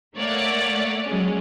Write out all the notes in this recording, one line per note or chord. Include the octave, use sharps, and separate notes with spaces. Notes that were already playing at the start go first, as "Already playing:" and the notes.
A3 A#3 C#5 D5 F#5
F#3 G#3 C#4